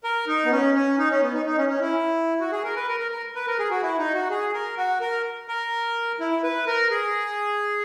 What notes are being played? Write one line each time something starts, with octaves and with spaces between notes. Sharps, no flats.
A#4
D#4
B3
C#4
C#4
D#4
C#4
B3
D#4
D#4
C#4
C#4
E4
F#4
G#4
A#4
B4
A#4
A#4
A#4
B4
A#4
G#4
F#4
E4
D#4
F#4
G#4
A#4
F#4
A#4
A#4
E4
B4
A#4
G#4